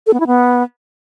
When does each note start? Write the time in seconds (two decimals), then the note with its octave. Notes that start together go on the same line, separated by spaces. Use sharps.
0.07 A4
0.13 B3
0.20 E4
0.27 B3